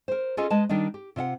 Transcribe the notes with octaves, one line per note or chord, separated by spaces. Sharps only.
A#4 C5
C#4 F4 G#4 A4 D#5
G#3 B4 D#5 A5
D#3 G3 D4 D#4
G4
C3 F4 E5 F#5